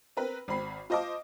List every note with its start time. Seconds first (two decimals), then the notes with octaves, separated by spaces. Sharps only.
0.17 C4 A#4 B4
0.48 G#1 C4 B5 C7
0.90 F4 C5 D#5 A5 D6